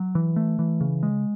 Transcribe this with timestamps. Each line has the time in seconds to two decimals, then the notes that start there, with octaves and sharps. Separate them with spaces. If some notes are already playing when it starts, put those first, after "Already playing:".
Already playing: F#3
0.15 E3
0.36 A3
0.59 E3
0.81 C#3
1.03 G#3